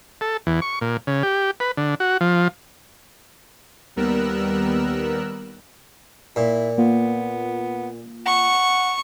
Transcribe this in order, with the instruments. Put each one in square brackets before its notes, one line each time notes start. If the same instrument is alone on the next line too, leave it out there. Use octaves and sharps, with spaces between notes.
[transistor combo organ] A4
E2
C#6
A#2
C#3
G4
B4
D3
F#4
F3
[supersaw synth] D#2 G3 B3 A#4 E6 F#6
[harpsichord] A#2 [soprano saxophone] E4
[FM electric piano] A#3 F4 [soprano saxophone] B3
[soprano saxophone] F#5 [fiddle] C#6